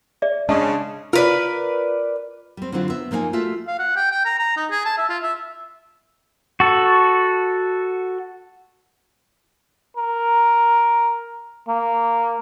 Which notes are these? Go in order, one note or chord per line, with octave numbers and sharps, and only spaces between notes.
G#4 D5 E5
C#3 G#3 D4 D#5 A5
F4 A#4 B4 D5
G3 C4
D3 F#3 C4 D4 E4 F4
B3 E5
F3 A#3 D#4 F5 G#5
A3 F4 F#4 E5
F5
F#5
G5
G5
A#5
A#5
D#4
G#4
A5
E5
F4
E5
F#4 A4
A#4
A#3